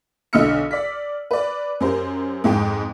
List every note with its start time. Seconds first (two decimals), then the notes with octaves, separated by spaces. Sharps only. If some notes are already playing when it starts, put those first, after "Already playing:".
0.33 B1 D3 D#5 E6 F6 C#7
0.71 D5 B6
1.31 B4 D5
1.80 F#2 G4 A#4 C5
2.44 F2 G#2 G#4 G5